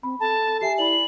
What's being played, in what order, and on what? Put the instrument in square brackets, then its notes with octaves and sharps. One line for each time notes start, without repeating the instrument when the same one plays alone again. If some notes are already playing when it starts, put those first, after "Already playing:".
[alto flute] C4 [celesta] B5
[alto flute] A4 [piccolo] A5
[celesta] G4 E5 G#5 [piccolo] C7
[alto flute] E4 [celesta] D5 B5 [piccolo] F#7